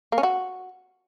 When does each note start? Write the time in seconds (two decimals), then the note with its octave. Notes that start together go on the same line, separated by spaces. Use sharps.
0.12 A#3
0.18 C#4
0.23 F#4